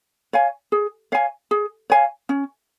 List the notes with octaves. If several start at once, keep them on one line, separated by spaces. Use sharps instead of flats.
C#5 F5 G#5
G#4
C#5 F5 G#5
G#4
C#5 F5 G#5
C#4